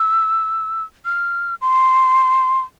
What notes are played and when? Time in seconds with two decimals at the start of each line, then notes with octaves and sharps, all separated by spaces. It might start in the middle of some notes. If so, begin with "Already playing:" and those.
Already playing: E6
1.05 F6
1.61 C6